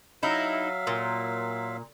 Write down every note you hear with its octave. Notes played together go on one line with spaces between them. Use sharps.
F#3 D#4 E4 E5 F5
A#2